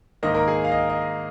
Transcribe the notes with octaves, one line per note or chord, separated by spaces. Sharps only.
G#2 D#3 A#3 D#5
A#4
G#4
F5
D#5
D#5